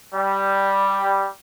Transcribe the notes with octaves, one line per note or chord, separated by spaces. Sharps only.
G3